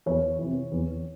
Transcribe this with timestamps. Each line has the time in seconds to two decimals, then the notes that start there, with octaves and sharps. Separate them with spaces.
0.06 E2 C#5
0.39 C3 E3
0.72 E2